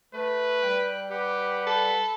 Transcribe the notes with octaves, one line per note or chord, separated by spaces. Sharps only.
A3 B4
G3 G5 F#6
G4 B4 F#5
A4 B5